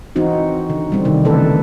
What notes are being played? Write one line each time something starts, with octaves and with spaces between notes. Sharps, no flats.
E3 C4 D#4 F#4
D3
G3 C4
C3 D#3
C#3 E3 A3 A4 B4